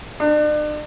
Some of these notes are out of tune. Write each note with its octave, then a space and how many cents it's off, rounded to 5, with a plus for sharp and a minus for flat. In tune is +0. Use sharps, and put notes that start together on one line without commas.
D4 +40